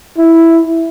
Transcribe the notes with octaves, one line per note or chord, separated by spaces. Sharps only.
E4